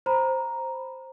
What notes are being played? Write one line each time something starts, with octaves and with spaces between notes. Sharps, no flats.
C5 A#5 B5